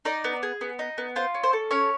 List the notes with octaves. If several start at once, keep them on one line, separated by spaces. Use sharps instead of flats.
D#4 D5
B3
G#4
B3
D#4
B3
F4 C5
C#4
C5
A4
C#4 C#5